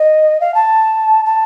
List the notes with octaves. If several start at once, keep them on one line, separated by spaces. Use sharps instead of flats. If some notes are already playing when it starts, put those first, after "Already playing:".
Already playing: D#5
F5
A5
A5